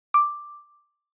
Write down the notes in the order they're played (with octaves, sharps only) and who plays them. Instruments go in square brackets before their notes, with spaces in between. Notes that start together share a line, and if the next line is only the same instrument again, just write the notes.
[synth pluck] D6